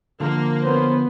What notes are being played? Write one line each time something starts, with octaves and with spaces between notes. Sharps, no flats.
D3 F3 A#3
F#2 B3 B4 C5